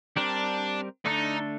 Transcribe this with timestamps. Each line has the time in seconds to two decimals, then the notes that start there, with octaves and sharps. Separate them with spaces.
0.16 G3 C4 D4 G4 A#4
1.05 D3 A3 D4 D#4 A4